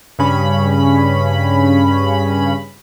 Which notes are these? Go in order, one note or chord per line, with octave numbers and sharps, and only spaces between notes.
G2 C#3 C#4 B5